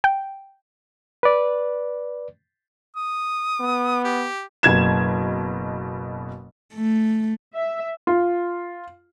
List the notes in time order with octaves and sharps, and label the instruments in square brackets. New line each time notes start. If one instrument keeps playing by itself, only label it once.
[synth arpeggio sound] G5
[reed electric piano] B4 D5
[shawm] D#6
[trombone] B3
[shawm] G4
[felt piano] F#1 B2 G#6 E7
[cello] A3
[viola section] E5
[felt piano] F4